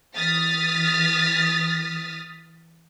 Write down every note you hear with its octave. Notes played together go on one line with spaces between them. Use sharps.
E3 D#6 F6 A6 B6